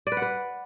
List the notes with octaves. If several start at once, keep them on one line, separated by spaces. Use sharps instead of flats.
D5
B4
F#5
B4